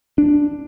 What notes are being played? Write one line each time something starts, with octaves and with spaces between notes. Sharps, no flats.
D4